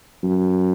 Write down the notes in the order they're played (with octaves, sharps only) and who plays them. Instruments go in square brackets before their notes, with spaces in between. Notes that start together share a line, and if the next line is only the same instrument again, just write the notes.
[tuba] F#2